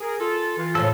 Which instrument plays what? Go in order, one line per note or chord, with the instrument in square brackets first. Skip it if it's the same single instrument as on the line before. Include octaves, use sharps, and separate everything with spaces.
[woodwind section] G#4 A#4
F4 A4
E3 F4
[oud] A2 C#3 F3 [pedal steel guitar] A4